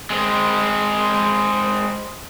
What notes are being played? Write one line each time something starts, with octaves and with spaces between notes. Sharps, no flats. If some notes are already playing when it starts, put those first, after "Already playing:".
G#3 C4